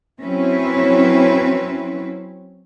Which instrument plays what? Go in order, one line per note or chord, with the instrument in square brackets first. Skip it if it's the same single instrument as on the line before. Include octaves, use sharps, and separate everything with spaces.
[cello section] F#3 C4 C#4 E4 B4